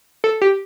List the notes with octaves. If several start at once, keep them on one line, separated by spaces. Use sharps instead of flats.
A4
G4